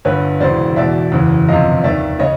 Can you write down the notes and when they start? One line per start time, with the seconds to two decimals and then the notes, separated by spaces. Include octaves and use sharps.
0.05 G1 G2 D3 B4 C#5
0.40 E1 E2 C#3 E3 C5 D5
0.76 E1 E2 B2 D5 E5
1.12 F#1 E2 C#3 E3
1.48 G1 F2 C3 D#5 F5
1.84 D#2 D#3 D5 E5
2.19 C#3 C#5 D#5